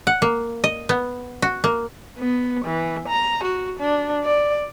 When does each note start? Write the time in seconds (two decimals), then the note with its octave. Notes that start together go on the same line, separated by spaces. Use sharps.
0.07 F#5
0.22 A#3
0.64 D#5
0.89 B3
1.42 F#4
1.64 A#3
2.19 B3
2.65 E3
3.08 A#5
3.43 F#4
3.80 D4
4.24 D5